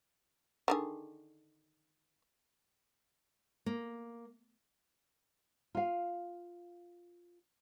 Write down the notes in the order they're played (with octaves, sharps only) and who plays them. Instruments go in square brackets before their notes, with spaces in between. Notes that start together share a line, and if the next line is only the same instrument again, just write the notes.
[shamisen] D3 D#3 G#4
[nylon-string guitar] A#3
F4 F5